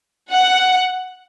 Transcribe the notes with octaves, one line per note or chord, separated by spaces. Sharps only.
F#5